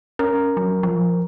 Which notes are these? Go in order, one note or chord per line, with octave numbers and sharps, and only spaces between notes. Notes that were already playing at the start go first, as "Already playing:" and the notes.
C#4 A#4
F#3
F3